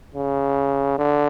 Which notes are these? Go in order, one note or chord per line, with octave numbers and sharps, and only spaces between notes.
C#3
D3